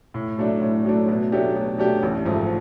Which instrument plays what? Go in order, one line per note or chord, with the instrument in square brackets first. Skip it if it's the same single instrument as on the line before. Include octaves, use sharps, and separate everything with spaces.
[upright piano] A2
F#3 A3 D4
A2
F#3 A3 D4
B2
F#3 A3 D4 G4
B2
F#3 A3 D4 G4
A1
G#2 F3 A3